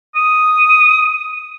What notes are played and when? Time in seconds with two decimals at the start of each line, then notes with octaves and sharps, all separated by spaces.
0.16 D#6